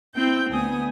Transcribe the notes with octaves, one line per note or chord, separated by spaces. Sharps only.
C4 E4 G5 G6
D2 B3 G#5 D#6